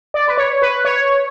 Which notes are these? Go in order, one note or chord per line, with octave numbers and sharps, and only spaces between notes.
D5
B4
C#5
B4
C#5